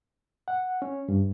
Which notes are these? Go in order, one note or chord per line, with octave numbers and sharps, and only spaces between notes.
F#5
C#4
G2